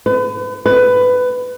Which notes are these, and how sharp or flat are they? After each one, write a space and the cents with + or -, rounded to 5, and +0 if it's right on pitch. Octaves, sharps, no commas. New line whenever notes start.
B4 +35
B4 +15